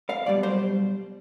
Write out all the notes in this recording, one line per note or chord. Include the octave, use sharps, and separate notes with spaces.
F5
B1 B2 G3 D5
C5